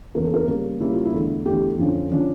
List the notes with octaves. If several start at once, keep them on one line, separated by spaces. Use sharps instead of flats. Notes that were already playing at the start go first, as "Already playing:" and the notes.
E2 C#3 E3 A#3 A#4
A4
A#4
C#3 G3 A#3
C#3 G3 A#3 E4
F4
E4
E2 D3 A3
E2 D3 A3 G4
F2 D3 F3 C#4
D3 F3 C#4 D4